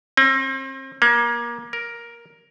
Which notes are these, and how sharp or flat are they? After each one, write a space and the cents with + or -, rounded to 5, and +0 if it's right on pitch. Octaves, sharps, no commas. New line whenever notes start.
C4 +35
A#3 +25
A#4 +10